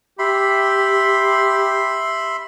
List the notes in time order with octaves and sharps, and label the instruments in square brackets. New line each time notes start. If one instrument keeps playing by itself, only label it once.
[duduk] G4 [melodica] E5 B5 C6